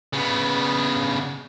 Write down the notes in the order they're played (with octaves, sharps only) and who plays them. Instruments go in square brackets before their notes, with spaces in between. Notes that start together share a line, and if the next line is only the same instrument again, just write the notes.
[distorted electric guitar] C#3 B3